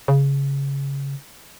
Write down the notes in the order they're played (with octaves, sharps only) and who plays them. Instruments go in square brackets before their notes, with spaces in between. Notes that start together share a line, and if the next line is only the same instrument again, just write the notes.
[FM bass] C#3